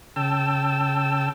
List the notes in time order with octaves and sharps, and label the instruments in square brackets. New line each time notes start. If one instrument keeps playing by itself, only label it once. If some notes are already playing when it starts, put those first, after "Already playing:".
[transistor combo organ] C#3 G5 A5 E6